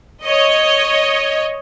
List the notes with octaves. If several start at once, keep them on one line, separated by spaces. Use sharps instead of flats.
C#5 D#5